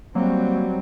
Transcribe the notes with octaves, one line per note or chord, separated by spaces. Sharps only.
F#3 G3 A#3 C4